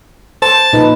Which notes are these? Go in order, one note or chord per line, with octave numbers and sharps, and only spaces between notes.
C5 A5
A#2 D#4 B4